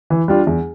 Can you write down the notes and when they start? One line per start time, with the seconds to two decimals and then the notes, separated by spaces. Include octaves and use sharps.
0.10 E3
0.28 G3 D4 F4
0.47 E2